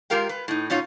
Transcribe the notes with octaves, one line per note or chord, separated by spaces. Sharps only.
G#3 F4 G4 A#4 F5 G5
B4
A2 D#4
B2 C#4 D#4 F4 C#5